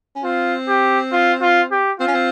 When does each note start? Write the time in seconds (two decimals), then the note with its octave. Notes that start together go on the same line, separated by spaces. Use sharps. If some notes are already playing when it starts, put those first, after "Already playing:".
0.16 C#4
0.24 C4 F4
0.68 G4
1.13 F4
1.42 F4
1.71 G4
2.00 C4 F4
2.08 C#4
2.15 C4